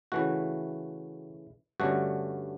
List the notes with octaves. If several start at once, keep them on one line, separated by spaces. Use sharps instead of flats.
C#3 E3 A3 F#4
G2 D3 A3 C#4 F#4